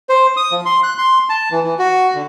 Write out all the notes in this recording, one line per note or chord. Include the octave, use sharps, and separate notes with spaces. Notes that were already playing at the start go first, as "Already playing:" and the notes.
C5
D#6
F3
C6
F#6
C6
A5
E3
E3
F#4
D3